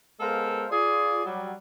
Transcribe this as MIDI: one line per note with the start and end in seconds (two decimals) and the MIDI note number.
0.20 0.66 56
0.20 0.66 59
0.20 0.66 69
0.20 0.66 70
0.20 0.66 72
0.20 0.66 77
0.71 1.21 65
0.71 1.21 68
0.71 1.21 74
1.25 1.53 54
1.25 1.53 55